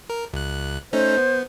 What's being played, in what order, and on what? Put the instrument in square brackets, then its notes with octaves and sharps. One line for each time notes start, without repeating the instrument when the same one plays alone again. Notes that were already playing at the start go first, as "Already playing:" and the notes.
[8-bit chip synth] A#4
C#2 F#6
[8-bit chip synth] A3 C#4 D#4 [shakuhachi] C5
[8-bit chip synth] B3